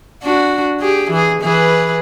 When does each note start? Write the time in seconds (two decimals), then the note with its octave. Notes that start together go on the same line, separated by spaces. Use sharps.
0.23 D4 F#4
0.80 G4 G#4
1.11 E3 G#4
1.41 E3 G#4 B4